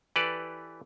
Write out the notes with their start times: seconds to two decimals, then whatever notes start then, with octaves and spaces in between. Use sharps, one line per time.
0.16 E3 G4 A4 B4 D5